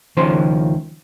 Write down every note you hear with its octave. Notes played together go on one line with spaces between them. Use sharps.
C#2 D#3 F3 C#4 C5